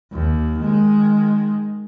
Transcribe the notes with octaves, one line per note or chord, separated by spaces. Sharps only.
D#2
D#3 G#3